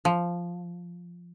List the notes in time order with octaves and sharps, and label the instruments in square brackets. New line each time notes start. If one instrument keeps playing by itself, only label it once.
[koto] F3